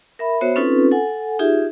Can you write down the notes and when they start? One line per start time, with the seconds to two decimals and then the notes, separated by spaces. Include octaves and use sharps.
0.19 A#4 E5 B5
0.41 B3 F#4 C5 C#5 E5
0.56 C4 C#4 D#4 F4 A4 B4
0.92 A4 F#5 G#5
1.39 D#4 F4 G4 G#4 E5